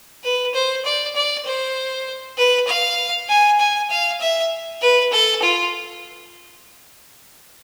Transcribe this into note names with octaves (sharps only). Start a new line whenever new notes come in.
B4
C5
D5
D5
C5
B4
F5
G#5
G#5
F5
E5
B4
A4
F4